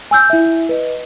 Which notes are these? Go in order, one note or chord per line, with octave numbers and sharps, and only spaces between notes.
G#5 E6 G6
E4 E5
B4 D#5